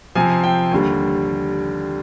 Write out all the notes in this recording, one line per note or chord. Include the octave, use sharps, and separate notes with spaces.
C3 F3 C4 G#5
G5
D#2 D3 G3